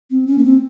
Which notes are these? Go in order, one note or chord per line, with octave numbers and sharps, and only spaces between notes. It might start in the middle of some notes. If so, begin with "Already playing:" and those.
C4
C#4
A#3
C4